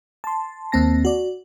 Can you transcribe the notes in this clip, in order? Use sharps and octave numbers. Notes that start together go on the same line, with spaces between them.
A5 C6
D#2 A#3 C4 A5 A#6
F#4 D5